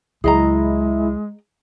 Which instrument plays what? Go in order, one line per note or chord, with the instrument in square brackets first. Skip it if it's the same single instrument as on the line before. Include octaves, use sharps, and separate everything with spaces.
[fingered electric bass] C#2 F#3 [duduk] G#3 [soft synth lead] E4 [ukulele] G#4 D#5 A#5